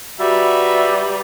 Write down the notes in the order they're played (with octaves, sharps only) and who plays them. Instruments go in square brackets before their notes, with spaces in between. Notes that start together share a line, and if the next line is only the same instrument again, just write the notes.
[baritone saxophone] G3 [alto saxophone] F#4 [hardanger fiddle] B4 A#5 [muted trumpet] E5